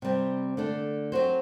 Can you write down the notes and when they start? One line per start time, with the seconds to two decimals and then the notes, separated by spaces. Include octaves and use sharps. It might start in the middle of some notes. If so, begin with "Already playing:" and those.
0.02 C3 G3 C4
0.57 D3 A3 D4
1.12 F#3 C4 F#4 C5